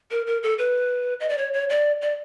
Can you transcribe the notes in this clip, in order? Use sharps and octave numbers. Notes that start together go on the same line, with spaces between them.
A#4
A#4
A4
B4
D#5
D5
C#5
C#5
D5
D5